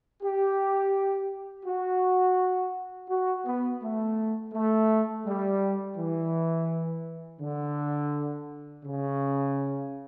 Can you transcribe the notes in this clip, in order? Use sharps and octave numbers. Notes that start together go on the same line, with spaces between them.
G4
F#4
F#4
B3
A3
A3
G3
E3
D3
C#3